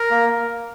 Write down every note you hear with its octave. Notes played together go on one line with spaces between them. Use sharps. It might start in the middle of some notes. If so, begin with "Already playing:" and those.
Already playing: A#4
A#3